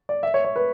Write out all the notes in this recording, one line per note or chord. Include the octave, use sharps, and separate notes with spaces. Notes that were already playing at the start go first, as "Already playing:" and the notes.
D5
E5
C#5
C#5
B4